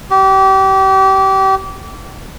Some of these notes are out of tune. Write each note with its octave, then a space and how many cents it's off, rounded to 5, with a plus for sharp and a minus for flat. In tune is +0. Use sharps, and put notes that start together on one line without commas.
G4 -30